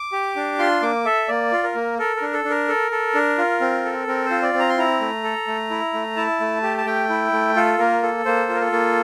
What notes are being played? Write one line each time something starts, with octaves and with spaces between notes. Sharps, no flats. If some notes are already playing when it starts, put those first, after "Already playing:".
Already playing: D6
G4
D4
F4 C6
A#3 D6
A4 E5
A#3 D5
F4
A#4
A#3
A4 A#4
A#4
D4
A4
D4
A#4
A4
A4
D4
F4
C4
A4
C4 A#4
F4 C5
D5
C4
A#5
C6
E4 A#5
A3
A4
A3
E4
A3
E4 A5
A3
G4
A5
A3 G5
E4
A3
F4 A4
A#3 A#4
A4
A#3 C5
F4
A#4
A4
A#3